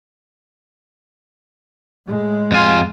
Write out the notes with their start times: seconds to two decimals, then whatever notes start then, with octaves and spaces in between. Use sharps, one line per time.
2.06 A2 G#3
2.52 F2 F4 G#5